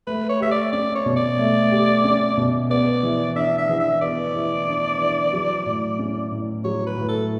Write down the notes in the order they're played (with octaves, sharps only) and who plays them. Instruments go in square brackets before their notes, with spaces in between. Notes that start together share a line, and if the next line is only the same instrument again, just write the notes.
[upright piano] A3 [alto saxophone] B4
[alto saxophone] C#5
[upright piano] G4 [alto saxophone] E5
[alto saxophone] D5
[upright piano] C#4 [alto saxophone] D5
[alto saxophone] C#5
[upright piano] B2
[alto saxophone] D5
[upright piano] A3
G4
C#4
B2
[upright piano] B3 [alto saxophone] D5
[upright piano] E3
[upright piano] D4 [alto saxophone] E5
[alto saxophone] E5
[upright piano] E3
[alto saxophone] E5
[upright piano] B3 [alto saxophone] D5
[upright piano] E3
D4
E3
F#3
A2
C#4
A2
[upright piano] F#3 [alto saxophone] C#5
[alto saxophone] B4
[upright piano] A2
[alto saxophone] A4